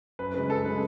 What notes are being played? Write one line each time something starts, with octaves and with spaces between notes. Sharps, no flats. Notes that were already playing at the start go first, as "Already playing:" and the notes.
F#2 B4
C#3 G#3 B4
F#2 A4
C#3 G#3 B4